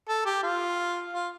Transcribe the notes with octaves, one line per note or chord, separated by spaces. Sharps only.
A4
G4
F4
F4